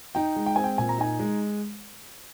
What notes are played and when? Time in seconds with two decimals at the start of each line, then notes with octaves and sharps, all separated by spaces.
0.15 D#4 G5
0.36 G#3
0.46 G5
0.56 C4 G#5
0.64 G5
0.78 A#2 G#5
0.89 A#5
0.98 D#4 G#5
1.20 G#3